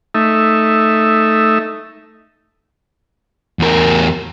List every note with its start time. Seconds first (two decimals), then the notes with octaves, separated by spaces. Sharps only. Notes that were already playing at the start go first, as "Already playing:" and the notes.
0.15 A3 D#4 E5
3.59 E2 A#4